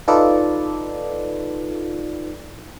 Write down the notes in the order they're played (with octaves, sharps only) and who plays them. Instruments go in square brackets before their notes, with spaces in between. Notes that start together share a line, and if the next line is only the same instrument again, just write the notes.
[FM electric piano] D#4 F4 A4 B4 D5